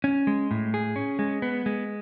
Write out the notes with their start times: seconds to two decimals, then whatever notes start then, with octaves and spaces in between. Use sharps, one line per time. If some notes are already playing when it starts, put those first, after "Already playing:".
0.04 C#4
0.27 G#3
0.51 A2
0.74 G#4
0.96 C#4
1.19 G#3
1.42 B3
1.66 G#3